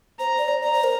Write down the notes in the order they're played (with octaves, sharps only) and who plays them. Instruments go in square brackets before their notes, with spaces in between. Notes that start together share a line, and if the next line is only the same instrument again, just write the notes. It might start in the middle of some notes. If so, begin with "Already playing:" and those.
[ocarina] C5 [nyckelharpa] A#5
[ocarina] D5
C5
[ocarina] D5 [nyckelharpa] A#5
[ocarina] C5
A#4